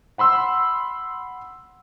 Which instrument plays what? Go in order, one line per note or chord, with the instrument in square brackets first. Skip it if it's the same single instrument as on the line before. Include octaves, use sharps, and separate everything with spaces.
[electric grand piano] F#5 B5 C6 E6